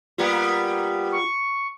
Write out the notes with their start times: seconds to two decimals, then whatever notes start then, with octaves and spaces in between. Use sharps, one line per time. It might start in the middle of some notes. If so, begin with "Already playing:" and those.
0.18 G3 A#3 B3 F4
1.12 C#6